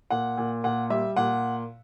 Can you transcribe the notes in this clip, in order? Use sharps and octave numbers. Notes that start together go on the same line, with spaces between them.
A#2 F#5
A#2
A#2 F#5
G3 E5
A#2 F#5